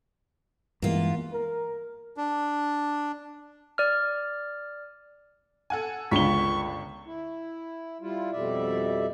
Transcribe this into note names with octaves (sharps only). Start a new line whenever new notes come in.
G2 E3 G#3 A#3 B3 F4
A#4
D4
D5 F6
A4 F#5 G#5
G1 C#2 D4 C#6 B6 G7
E4
G3 E4 F4
F2 B2 G3 D5 E5